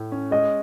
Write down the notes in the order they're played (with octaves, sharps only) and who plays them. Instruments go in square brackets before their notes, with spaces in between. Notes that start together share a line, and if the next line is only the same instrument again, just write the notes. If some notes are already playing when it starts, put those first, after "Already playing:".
Already playing: [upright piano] A2
C#4
[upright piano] G#3 [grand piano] D#5